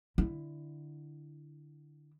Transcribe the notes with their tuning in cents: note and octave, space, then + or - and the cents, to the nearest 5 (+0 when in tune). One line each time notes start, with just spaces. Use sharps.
D3 +15 E4 +5